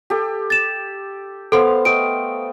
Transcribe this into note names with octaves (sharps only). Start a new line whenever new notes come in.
G4 A4
A6 E7
B3 A4 C5 F5 C6
A3 D#5 G5 D7